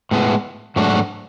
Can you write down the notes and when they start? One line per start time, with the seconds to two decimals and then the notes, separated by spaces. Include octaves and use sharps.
0.11 A2 G#3 B3
0.76 G#2 F#3 A3 D4 F#4